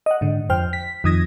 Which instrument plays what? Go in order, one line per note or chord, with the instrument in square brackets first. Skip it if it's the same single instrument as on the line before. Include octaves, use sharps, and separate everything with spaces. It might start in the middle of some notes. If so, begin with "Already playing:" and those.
[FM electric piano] D#5 F#5
G#2 D3
F2 C5 G5 F6
B6
F2 D#3 D#6 G#6 A#6